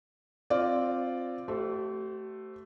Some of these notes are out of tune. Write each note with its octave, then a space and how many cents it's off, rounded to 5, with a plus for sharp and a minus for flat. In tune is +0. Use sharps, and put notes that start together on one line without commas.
C4 +0 F4 +0 D5 +0
A3 +0 G4 -45 C5 +0